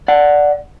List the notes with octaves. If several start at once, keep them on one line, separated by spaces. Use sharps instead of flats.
D5 F#5